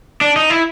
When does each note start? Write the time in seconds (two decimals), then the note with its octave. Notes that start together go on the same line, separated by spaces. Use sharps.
0.21 D4
0.36 D#4
0.50 E4